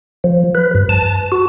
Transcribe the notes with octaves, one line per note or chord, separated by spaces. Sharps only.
F3
B4
G2
A5
F#4